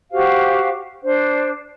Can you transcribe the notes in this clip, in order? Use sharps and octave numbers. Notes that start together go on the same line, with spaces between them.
F#4 G4 C5 F5
D4 C5